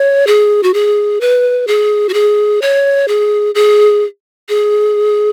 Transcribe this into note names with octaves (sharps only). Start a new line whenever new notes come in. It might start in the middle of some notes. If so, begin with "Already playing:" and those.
Already playing: C#5
G#4
F#4
G#4
B4
G#4
F#4
G#4
C#5
G#4
G#4
G#4